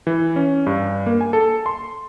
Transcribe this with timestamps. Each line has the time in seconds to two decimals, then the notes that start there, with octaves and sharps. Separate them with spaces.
0.07 E3
0.36 C#4
0.67 G2
1.06 A#3
1.21 G#5
1.33 A4
1.66 C6